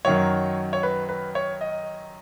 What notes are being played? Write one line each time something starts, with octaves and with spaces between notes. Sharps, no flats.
F#2 D#3 F#3 C#5
C#5
B4
B4
C#5
D#5